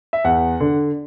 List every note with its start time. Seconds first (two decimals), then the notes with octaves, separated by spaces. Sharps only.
0.13 E5
0.24 E2 F#5
0.60 D3